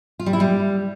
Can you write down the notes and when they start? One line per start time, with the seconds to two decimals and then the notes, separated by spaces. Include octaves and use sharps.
0.20 F4
0.26 G3
0.33 E4
0.40 G3